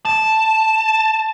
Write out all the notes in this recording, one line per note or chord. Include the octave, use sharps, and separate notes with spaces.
A5